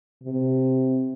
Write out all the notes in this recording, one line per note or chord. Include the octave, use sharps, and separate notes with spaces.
C3